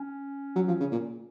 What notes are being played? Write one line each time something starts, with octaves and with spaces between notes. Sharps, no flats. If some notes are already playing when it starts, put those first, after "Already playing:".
Already playing: C#4
F#3
F3
C#3
A#2